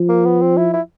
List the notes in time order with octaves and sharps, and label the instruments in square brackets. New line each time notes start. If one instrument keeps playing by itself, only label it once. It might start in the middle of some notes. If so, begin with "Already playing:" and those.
Already playing: [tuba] F3
[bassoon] A#3
B3
C4
E4
E4